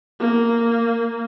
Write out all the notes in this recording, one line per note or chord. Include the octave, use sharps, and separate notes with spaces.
A#3